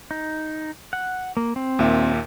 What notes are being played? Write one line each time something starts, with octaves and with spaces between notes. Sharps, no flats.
D#4
F#5
A#3
C4
D#2 A#2 E5